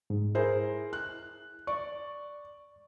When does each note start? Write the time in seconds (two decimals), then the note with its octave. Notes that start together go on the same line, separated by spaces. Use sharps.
0.10 G#2
0.35 E4 G#4 A#4 C5
0.93 F#6
1.67 D5 C#6